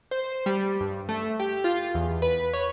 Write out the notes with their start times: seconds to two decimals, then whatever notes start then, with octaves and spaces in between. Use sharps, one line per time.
0.11 C5
0.46 G3
0.80 G2
1.09 A3
1.40 G4
1.64 F4
1.94 E2
2.22 B4
2.53 C#5